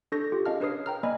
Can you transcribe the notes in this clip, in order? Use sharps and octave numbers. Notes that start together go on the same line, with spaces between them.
D4 A4 C#6 G6 A#6
F4 G4
C#4 G#4 D#5 F5 A5 F6
D4 A#4 B4 C#5 D#6 C7
G5 A#5 F6
A#3 D5 D#5 G#5 B5